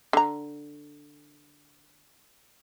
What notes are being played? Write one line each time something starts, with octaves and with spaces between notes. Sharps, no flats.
D3 A#5